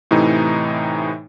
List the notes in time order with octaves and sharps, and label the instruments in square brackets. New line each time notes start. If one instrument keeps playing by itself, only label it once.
[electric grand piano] A2 C3 E3 D#4